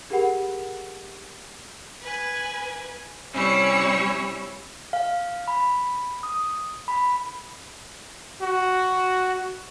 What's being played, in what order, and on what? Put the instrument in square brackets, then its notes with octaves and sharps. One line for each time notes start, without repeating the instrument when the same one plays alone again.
[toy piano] D4 G4 G#4 A#4 F#5 B5
[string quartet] B4 G#5
C3 G3 C#4 E4 C#5 E6
[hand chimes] F5
B5
D#6
B5
[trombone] F#4